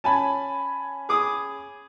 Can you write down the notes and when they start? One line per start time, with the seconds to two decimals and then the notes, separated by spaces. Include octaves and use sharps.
0.04 C#4 G#5 A5 B5
1.09 G#4 D6 D#6